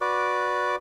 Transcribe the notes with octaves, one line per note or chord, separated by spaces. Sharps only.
F#4 B4 D5 D6